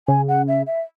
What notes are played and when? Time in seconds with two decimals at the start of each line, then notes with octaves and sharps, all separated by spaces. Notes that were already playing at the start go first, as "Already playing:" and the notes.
0.08 C#3 G#5
0.28 F#5
0.48 E5
0.67 E5